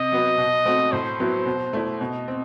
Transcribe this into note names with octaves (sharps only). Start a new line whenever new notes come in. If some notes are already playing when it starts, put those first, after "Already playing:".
Already playing: C3 D#5
F#3 B3
B2
A3 C4 F#4
A2 C5
F#3 B3 E4
B2
A3 E4
B2 D#5
C4